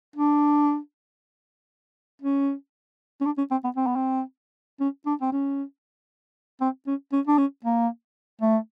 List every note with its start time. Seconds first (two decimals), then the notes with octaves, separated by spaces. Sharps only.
0.16 D4
2.22 C#4
3.21 C#4
3.26 D4
3.38 C#4
3.51 C4
3.64 B3
3.77 C4
3.87 B3
3.96 C4
4.80 C#4
5.06 D4
5.21 C4
5.32 C#4
6.61 C4
6.87 C#4
7.13 C#4
7.27 D4
7.38 C#4
7.65 A#3
8.42 A3